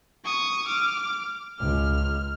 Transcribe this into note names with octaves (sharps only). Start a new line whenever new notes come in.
C#6 D#6
D6 F6
C#2 F6